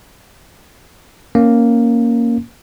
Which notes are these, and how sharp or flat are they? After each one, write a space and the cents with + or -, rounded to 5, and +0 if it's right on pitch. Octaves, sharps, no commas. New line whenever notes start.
A#3 +0 C#4 +0